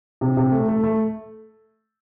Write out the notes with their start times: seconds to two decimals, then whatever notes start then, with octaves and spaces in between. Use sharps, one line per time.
0.21 C3
0.37 C3
0.52 A3
0.68 A3
0.84 A3